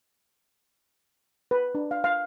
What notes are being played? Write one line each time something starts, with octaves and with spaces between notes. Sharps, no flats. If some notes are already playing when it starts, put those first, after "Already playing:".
B4
D4
F5
F5